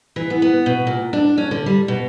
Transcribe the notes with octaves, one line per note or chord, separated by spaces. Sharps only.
E3
B3
B3
B2
A#2
D4
C#4
D3
G3
B2